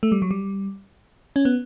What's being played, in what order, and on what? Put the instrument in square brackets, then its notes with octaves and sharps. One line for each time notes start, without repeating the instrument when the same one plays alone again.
[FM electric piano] A3
G3
F#3
G3
C#4
B3